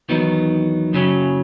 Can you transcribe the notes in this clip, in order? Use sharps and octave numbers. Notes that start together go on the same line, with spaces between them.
E2 D#3 F#3 B3 D#4
F#2 C#3 F#3 C#4